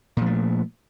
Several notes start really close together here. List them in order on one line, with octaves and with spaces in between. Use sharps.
A#2 F3 A3